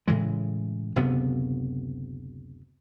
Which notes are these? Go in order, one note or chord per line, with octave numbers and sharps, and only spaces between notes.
A2 C#3 E3 G#3
F#1 D2 C3 B3